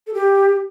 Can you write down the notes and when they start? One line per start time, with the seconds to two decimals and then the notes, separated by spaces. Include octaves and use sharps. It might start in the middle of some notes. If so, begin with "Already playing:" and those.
0.07 A4
0.14 G4